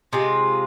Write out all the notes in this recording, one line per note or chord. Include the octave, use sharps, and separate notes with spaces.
C3 G#3 F4 G#4